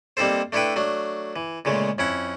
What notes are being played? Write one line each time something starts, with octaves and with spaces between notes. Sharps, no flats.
G3 A#3 C4 D#4 A4 C5
A3 D4 E4 A4 B4 G5
F#3 A3 D4
E3
A#2 C#3 G#3 A3
F2 C#4 E4 F#5